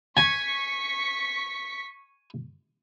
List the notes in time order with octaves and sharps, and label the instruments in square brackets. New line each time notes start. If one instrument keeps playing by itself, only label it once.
[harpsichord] G#5 [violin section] C#6 B6